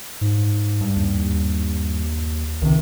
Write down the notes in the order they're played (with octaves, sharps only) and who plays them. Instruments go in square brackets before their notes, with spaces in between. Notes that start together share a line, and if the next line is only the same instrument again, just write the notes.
[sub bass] G#2
[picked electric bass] G2
[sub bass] D#2
[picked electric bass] C#2 C3 [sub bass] D#3